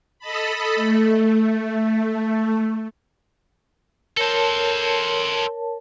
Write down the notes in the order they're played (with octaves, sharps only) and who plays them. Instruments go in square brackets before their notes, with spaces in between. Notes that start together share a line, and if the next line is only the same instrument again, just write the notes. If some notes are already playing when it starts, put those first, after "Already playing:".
[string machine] A4 D#5 A5 B5
A3
[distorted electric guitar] A4 C5 [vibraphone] A#4 C#5 A5